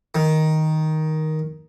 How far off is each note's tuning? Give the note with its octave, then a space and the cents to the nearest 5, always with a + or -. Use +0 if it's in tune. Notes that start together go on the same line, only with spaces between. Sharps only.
D#3 +5